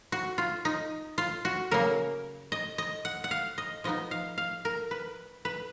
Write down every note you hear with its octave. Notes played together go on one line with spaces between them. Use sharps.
F#4
F4
D#4
F4
F#4
C#3 F#3 A#3 A#4
D#5
D#5
F#5
F#5
F5
D#5
F3 B3 D#4 D#5
F5
F5
A#4
B4
B4